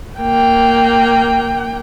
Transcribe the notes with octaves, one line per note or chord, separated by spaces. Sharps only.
A#3 G5